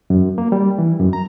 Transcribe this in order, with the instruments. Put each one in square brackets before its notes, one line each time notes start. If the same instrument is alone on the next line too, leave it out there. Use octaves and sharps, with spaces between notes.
[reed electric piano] F#2
A#3
G3
E3
F#2
A#5